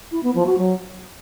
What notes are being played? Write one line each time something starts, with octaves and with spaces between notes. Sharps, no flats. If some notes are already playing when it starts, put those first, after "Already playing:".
E4
B3
F3
F#4
F#3